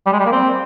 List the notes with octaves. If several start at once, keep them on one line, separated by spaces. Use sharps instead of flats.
G3
G#3
G3
A#3
C4